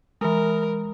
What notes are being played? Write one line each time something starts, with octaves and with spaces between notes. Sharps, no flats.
E3 G#3 A#4